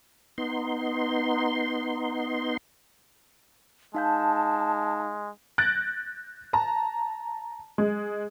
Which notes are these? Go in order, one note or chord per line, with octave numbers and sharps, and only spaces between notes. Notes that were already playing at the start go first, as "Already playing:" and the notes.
B3 D#4 C6
G#3 D#4 F5 A5 G6
F#6 G6 A6 A#6 D7
A5 A#5
G#3